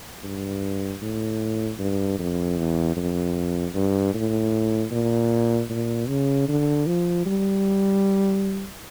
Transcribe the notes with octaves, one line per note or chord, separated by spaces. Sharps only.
G2
A2
G2
F2
E2
F2
G2
A2
A#2
A#2
C#3
D3
F3
G3